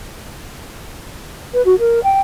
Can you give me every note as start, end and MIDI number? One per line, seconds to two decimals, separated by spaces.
1.53 1.61 71
1.66 1.74 66
1.79 2.02 70
2.03 2.20 79